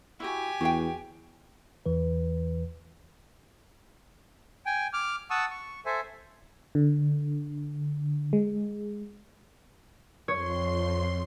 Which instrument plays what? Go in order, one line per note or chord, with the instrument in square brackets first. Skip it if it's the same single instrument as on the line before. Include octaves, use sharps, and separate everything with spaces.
[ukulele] E4 F#4 [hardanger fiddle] G4 G#5
[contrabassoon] E2 [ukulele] F#4 G#4 G5
[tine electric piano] E2 E3 B4
[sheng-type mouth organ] G5 G#5
D6 F6
F#5 A5 C#6 D#6 E6
C#6
A4 C5 E5 G#5
[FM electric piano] D3
G#3
[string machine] F2 C6 [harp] C#5